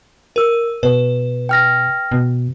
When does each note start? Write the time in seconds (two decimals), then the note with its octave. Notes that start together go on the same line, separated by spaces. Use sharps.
0.36 A#4 E6
0.83 B2 B4
1.49 G5 F6 A#6
2.11 B2